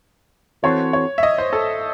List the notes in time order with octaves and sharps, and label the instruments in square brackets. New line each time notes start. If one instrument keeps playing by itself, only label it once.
[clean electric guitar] E3 C4 F#4 A4 C5 [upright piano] C#5
[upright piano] C#5
E5
D#5
C5
A4